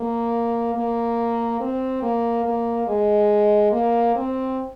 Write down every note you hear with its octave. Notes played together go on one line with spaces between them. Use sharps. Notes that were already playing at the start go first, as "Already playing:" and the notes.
Already playing: A#3
A#3
C4
A#3
A#3
G#3
A#3
C4